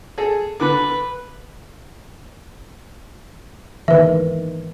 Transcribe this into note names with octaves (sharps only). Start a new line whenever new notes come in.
G#4 A4
D3 B4 D6
D#3 E3 B4 E5